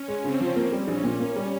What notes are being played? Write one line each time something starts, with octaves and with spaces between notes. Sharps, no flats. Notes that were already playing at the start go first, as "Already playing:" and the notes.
Already playing: C#4
G#3
C#3 C4
F3
A#3
G3
A#1 C#4
A#2
A#3
G3